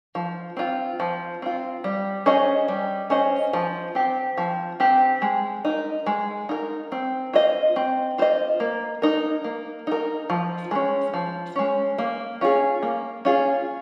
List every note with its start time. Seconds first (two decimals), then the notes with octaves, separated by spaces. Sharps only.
0.15 F3
0.57 C4 F4
1.00 F3
1.42 C4 F4
1.84 G3
2.26 C#4 G#4 C5 D#5
2.68 G3
3.10 C#4 G#4 C5 D#5
3.53 F3
3.95 C4 G4
4.38 F3
4.80 C4 G4
5.22 G#3
5.65 D#4 A#4
6.06 G#3
6.49 D#4 A#4
6.92 C4
7.33 F4 C5 D#5
7.76 C4
8.18 F4 C5 D#5
8.60 A#3
9.02 D#4 A#4
9.44 A#3
9.87 D#4 A#4
10.30 F3
10.71 G#3 C#4
11.14 F3
11.56 G#3 C#4
11.98 A#3
12.41 C#4 F4 G#4
12.83 A#3
13.25 C#4 F4 G#4